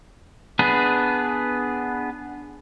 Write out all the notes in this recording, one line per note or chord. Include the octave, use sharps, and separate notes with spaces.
B3 D4 G#4 B4